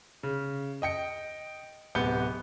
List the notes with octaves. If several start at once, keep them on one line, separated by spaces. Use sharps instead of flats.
C#3
D#5 G5 C#7
D1 C3 B3 G6 C#7 G7